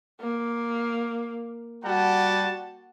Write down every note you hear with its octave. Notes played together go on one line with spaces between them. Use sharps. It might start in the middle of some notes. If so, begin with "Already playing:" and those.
A#3
G3 F#4 F#5 A5